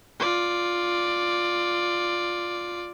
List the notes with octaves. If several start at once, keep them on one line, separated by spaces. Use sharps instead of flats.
F4 D5